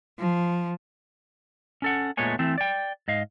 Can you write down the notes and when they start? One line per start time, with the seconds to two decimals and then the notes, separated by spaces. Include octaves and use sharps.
0.19 F3
1.82 C#4 A4 F#5
2.17 A#2 G#3 A3 B3 C#5 G#5
2.39 E3 A3 C4
2.58 D5 G5
3.08 G#2 D#5 F5